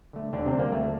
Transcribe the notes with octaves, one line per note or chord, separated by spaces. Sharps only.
D3 A3
D#2 D3 D4
C3 C4
D3 G3
A#3
D2 A3